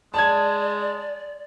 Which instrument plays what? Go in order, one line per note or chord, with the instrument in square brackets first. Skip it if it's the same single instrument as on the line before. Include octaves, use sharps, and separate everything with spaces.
[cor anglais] G#3 [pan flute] D5 [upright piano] A5 G#6